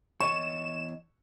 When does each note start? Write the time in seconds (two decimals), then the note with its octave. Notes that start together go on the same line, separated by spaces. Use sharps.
0.20 E2 C#5 D#5 C#6 E7